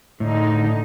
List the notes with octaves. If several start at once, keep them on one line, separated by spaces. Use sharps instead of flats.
A2 D3 D#4